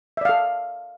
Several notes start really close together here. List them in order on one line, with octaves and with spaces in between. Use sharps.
E5 D5 F5 A4